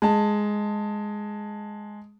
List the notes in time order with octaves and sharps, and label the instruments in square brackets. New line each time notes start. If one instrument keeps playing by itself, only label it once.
[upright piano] G#3 A5